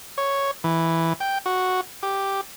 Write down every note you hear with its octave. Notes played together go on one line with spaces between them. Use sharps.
C#5
E3
G5
F#4
G4